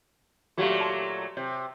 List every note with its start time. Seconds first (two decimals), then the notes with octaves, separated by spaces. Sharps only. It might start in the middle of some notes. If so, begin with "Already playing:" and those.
0.58 A#2 F#3 A3 F#4 G4 F5
0.80 A5 C6
1.37 C3 C#5